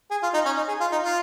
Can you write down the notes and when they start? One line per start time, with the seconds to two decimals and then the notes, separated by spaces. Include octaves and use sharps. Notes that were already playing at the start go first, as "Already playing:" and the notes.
0.11 G#4
0.23 F4
0.34 D#4
0.46 C#4
0.57 D#4
0.68 G#4
0.81 F4
0.92 D#4
1.04 F4